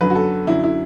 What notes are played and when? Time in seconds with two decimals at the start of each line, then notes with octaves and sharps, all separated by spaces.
0.01 F#2 D3 F#3 B4
0.10 F#4
0.15 A4
0.47 F#2 D3 F#3 E4
0.64 E4